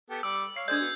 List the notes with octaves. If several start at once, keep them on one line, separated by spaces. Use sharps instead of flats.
B3 G4 A4
G3 D6 E6
C#5 F5 C7
G#3 D4 A4 C5 D5 D#5 G6 G#6
B3 F#4